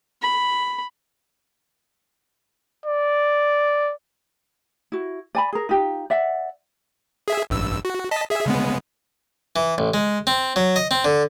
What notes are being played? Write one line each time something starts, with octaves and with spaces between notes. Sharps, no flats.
B5
D5
E4 F#4
D5 G#5 B5
G#4 A#4
D#4 F4 G4
D5 E5 F#5
G#4 E5
A1 G2 E6
F#4
D#5 A5 B6
G#4 E5
C#3 G#3 B3
E3
A1
G#3
C4
F#3
D#5
C4
D3